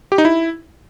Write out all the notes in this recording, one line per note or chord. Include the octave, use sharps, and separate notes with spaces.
G4
D#4
E4